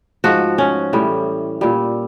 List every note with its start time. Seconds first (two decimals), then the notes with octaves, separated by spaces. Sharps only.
0.24 G#2 F3 F#4
0.58 C#4
0.93 A2 E3 G3
1.61 A#2 G3